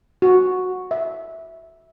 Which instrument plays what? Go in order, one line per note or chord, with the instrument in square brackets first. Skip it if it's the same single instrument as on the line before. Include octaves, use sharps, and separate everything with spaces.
[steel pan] F#4
E5